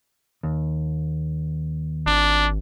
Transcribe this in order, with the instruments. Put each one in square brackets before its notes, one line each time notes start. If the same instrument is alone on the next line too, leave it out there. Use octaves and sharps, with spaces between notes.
[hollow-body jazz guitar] D#2
[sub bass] G#1 [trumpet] D4